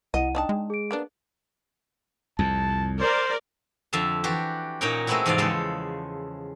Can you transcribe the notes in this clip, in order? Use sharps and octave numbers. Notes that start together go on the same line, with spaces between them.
C2 E4 D#5 F#5 D#7
D4 D#4 D#5 G5 A5
G#3
G#4 D7
A#3 B3 D4
C2 F2 A5
A#4 C5 D5
F2 D3 E5 F5 A5
E3 D4 F#4 G4
A#2 C#4 D#4 A#4 F#5 G5
G#3 A3 B3 C4 E4 F#4
E2 G#2 C3 F3 D5 F5
C#3 G#3 A4 C5